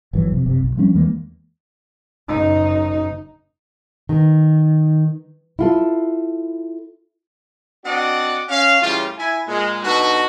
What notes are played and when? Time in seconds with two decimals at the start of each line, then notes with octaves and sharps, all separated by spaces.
0.13 G1 E3 F#3
0.30 F2 C3
0.46 F#1 C3
0.60 B1
0.77 F3 G3 C#4 D4
0.95 E2 E3 G#3 A#3
2.29 F#1 D#4
4.09 D#3
5.59 E4 F4 A4
7.85 C4 D4 F#4 D5 D#5 F#5
8.49 C#4 F5
8.82 A2 C#3 E3 G3 F4
9.18 E4 G#5
9.47 A#2 G#3
9.83 B2 D3 D#4 F#4